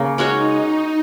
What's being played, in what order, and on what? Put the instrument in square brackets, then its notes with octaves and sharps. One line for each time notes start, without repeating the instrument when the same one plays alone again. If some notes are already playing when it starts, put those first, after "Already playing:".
Already playing: [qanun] C#3 A#3
[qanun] G#3 C#4 F#4 C#5 [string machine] D#4